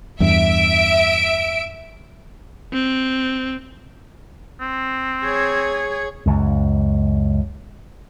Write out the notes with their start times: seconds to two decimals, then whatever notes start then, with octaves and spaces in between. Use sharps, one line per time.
0.20 E2 G2 E5 D7
2.73 C4
4.61 C4
5.24 G#4 C#5
6.26 C#2 F#2